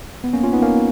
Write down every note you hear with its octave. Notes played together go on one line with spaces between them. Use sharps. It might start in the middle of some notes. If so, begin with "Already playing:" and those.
B3
A#3 C#4
C#4 F4
B3 D#4
A#3 C#4